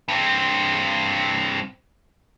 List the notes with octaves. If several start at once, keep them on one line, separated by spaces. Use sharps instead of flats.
G2 C4